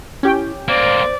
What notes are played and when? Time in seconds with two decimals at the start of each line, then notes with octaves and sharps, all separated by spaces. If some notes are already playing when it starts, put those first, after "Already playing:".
0.23 C#4 E4 G4 G5
0.68 A#3 C4 C5 D5